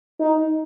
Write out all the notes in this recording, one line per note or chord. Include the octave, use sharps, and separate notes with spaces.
D#4